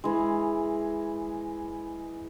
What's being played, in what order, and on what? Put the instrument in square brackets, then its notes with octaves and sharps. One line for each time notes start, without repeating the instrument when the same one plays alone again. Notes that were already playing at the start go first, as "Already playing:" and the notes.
[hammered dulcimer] E3 G#3